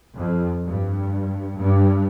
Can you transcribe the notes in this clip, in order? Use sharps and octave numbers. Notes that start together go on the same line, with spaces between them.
F2
G2
G2